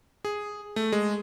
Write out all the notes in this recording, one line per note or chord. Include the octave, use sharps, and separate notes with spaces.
G#4
A3
G#3